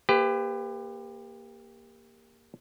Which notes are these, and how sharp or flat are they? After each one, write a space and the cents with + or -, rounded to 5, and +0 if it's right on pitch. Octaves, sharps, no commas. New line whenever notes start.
A#3 +0 G4 +25 B4 +35